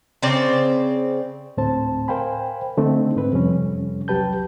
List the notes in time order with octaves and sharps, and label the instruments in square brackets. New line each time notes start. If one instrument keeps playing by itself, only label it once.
[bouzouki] C#3 C4 D5
[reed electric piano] D2 A2 C4 C5 A5
A#4 C5 F5 G5 G#5 B5
D3 A3 C4 D#4
G#2 C4 B4
F2 C3 G3 C#4
C2 F#3 G4 B4 A5 G6